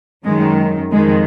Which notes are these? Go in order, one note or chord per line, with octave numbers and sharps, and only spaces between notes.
F#2 D#3 G#3
F2 D#3 G#3